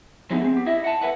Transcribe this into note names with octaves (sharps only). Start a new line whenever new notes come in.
F3 F#3 G#3 A3 B3 D#4
C4 G#4
B3 G4
E4 D#5 E5
F#5 A5
A4 B4 E5 F#5